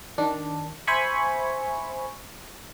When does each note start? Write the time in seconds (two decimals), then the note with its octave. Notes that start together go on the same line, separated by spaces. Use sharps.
0.18 D#3 D4
0.87 C5 E5 G#5 B5 C#6